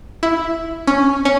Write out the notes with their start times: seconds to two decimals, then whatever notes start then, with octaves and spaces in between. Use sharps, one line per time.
0.23 E4
0.87 C#4
1.25 C#4